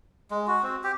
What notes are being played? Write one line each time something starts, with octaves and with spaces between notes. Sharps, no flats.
G#3
F#4
C4
G4